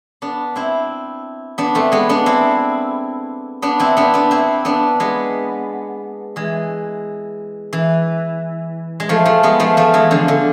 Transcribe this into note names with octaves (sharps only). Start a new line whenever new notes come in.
B3 D4
C4 E4
B3 D4
A3 C4
G#3 B3
B3 D4
C4 E4
B3 D4
C4 E4
B3 D4
B3 D4
C4 E4
B3 D4
G#3 B3
E3 G#3
E3
G#3
F3 A3
F3 A3
G#3 B3
F3 A3
F3 A3
E3 G#3
D3 F3
D3